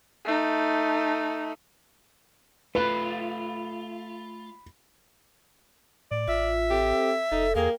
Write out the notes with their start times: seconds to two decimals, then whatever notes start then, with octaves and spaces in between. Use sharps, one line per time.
0.25 A3 D#4
2.75 A3 F4 B4 B5
6.11 A2 D5
6.28 A1 F4 E5
6.70 C4 G4 A4 C5
7.32 F1 D#4 A4
7.55 E2 A#3 G#4 A#4 G5